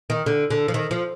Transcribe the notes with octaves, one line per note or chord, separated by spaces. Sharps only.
D#3
D3
D3
F3
D#3
F3